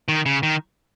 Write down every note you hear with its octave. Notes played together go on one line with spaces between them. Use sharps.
D#3
C#3
D#3